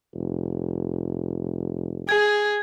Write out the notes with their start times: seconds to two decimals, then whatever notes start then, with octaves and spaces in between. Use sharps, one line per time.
0.14 F1
2.09 G#4 G#6